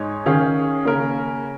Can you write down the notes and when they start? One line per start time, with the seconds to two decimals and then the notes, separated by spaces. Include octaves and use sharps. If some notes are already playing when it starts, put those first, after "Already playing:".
Already playing: G#2 G#3 D#4 C#5
0.26 D#3 C#4 G#4 F5
0.85 C#3 A#3 C#4 A#4